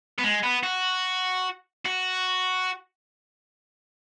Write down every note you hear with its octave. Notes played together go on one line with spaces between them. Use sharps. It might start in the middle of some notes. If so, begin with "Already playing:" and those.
B3
G#3
B3
F#4
F#4